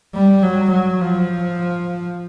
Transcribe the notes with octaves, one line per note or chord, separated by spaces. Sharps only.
G3
F#3
F#3
F3